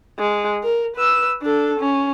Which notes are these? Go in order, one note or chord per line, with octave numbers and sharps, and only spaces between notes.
G#3
A#4
B4 E6
D4 A4
C#4